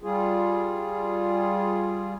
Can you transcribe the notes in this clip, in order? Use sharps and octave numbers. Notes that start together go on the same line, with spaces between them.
G3 F4 G#4